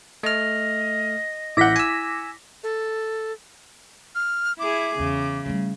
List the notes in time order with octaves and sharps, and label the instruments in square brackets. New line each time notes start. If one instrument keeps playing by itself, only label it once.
[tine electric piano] A3 F6 [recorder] D#5
[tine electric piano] A1 G6 [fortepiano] E4 F#5 [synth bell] D6 A#6 B6
[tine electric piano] G#5 E6
[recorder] A4
[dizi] F6
[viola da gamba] E4 G#4 [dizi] D6
[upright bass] E2 [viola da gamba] C#3
[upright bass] G3 A3